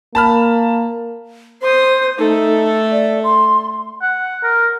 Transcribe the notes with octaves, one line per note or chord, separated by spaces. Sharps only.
A#3 A5 B5 F6
C5 C6 D#6
A3 D#4 A4
D5
C6
F#5
A#4